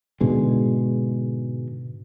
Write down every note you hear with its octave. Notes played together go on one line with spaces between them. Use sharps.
G#2 B2 D3 G#3